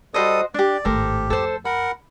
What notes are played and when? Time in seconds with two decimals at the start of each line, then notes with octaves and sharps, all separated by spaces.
0.14 G3 F#4 A4 C5 D#5 D#6
0.54 D4 G4 D5
0.85 G#1 A2 G4 A4 A#4 C5
1.30 F2 A4 C5
1.65 A#4 F#5 B5